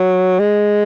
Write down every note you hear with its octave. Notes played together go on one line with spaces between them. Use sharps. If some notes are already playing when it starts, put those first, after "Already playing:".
Already playing: F#3
G#3